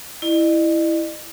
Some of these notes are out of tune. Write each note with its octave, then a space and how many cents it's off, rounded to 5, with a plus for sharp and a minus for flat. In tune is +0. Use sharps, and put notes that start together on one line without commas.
E4 +0 D#5 -45